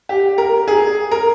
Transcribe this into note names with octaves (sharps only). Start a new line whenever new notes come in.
G4
A#4
G#4
A#4